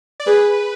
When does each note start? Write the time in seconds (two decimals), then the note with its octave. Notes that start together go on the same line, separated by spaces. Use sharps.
0.20 D5
0.27 G#4 B4